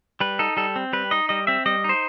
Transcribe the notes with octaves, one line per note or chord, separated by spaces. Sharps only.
G3 B4
D#4 A4
G3 A4
C4
G3 B4
D#4 D#5
G3 D#5
C4 E5
G3 D#5
D#4 C5